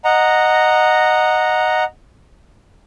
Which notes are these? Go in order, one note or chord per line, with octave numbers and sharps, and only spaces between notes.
D#5 F#5 A#5